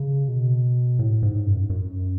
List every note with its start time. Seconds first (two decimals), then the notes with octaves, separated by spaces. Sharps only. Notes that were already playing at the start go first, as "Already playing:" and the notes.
Already playing: C#3
0.28 B2
0.99 A2
1.23 G#2
1.46 F#2
1.70 F#2